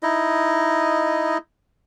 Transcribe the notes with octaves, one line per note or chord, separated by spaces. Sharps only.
D#4 E4 D#5